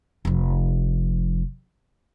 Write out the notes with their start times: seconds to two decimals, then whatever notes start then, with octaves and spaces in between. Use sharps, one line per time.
0.25 F1 F3